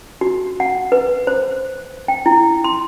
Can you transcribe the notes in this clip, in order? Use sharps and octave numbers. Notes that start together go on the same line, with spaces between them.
F#4
F#5
B4
C5
G5
E4
C6